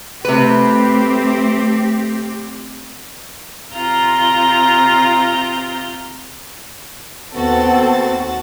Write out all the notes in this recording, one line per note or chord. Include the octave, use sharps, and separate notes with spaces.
C3 A3 C4 G4 B4
C3 F4 A#5 G6
D#2 B3 C4 F#4 A4 A6